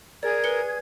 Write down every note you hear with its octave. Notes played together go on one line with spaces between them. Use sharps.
G#4 A#4 D5 G#6
B4 C#7 G7